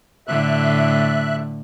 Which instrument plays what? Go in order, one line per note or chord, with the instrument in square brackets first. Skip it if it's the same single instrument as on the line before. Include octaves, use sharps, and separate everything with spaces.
[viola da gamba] A2 D3 [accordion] E5 F#6